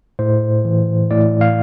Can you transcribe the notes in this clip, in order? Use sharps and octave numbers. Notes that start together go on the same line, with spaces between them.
A2 C5
E3
A2 D5
F5